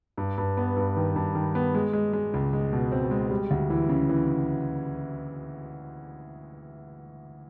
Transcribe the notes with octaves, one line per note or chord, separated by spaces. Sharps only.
G2
G2
B3
G2
D#3
G2
D#3
B3
G#3
G#3
G#3
C#2
G#3
B2
C4
G#3
G3
D2
E3
C#3
E3
C#3